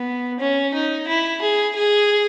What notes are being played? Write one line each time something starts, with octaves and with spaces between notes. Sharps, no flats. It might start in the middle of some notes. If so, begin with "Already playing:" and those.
Already playing: B3
C#4
D#4
E4
G#4
G#4